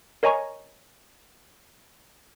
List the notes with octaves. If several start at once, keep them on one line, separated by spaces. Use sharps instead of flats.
A#4 C#5 D#5 G#5 A#5 C#6